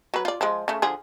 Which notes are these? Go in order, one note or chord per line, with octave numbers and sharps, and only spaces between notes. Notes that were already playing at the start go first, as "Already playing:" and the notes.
F#3 B4
F4 D5
F3 G#3
C#3 A3
D3 F3 G#4